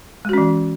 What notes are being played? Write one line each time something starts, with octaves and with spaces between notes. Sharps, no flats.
E3 G#3 C#4 F#4